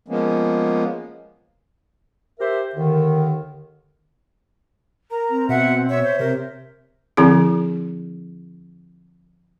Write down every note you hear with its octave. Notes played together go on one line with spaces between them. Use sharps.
F3 G#3 A#3 B3 C#4
G4 A#4 C5 E5
D#2 D3 D#3
A#4 A#5
C4
B2 E5 F#5
C#5 E5
C5 E5
C3 A#4
D3 F3 C4 E4 G#4